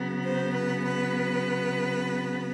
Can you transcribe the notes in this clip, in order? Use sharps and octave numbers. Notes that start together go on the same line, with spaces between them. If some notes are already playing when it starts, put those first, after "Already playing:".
Already playing: C#3 F#3 B3
C5
B4
B4